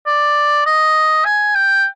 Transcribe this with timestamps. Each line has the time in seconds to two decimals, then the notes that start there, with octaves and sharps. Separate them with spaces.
0.07 D5
0.66 D#5
1.25 G#5
1.55 G5